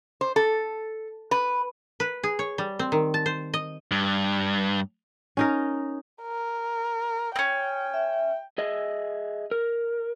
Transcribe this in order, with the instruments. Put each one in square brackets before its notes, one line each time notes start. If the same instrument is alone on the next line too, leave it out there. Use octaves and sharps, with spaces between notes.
[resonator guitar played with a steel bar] C5
A4
B4
[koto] B4
G#4
C#5
G3
C4
D#3
A5
C5
D#5
[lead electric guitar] G2
[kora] C#4 D#4 A#4
[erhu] A#4
[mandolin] C4 C#4 [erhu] G5
[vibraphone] E5
[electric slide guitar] G#4 D#5 E5
A#4